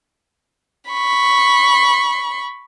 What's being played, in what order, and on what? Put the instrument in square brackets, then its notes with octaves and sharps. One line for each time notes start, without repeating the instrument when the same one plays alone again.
[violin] B5 C#6